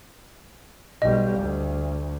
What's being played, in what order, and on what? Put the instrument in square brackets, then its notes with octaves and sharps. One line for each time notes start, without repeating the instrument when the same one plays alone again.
[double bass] B1 G3 [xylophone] D#5
[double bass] D2